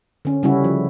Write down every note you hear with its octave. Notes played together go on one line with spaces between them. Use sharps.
D3 C#4
C#3 G3 C#4 E4 F#4
F3